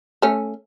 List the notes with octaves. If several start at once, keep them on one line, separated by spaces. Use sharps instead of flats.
A3 C#4